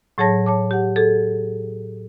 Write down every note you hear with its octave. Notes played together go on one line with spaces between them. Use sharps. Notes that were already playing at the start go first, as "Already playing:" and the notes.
A2 F#3 G#4 C#5 A5 A#6
C#5 A5 D6
G4 F#5
G#4 A4